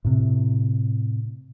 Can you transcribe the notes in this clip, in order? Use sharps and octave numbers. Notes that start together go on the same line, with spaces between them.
A2 C3